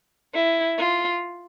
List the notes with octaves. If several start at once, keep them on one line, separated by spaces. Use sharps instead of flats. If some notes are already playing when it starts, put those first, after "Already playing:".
E4
F4